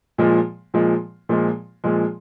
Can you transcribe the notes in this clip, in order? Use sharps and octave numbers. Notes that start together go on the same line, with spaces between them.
A#2 F3 G#3
A#2 F3 G#3
A#2 F3 G#3
A#2 F3 G#3